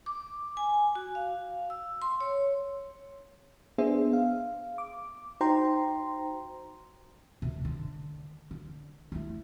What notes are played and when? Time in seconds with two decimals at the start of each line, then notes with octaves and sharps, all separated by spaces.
0.06 D6
0.57 G#5
0.95 F#4
1.15 F5
1.70 E6
2.02 C6
2.20 C#5
3.78 B3 D4 G#4 C5 E5
4.13 F5
4.78 D6
5.41 D#4 F#4 C5 G5 A#5 C6
7.42 D2 C3
7.65 D3
8.51 D3
9.12 A3 E4